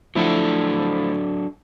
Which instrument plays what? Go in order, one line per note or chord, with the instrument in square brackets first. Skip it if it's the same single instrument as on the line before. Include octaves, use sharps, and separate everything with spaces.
[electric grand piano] F3 A3 E4 [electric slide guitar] F#3 D4 A4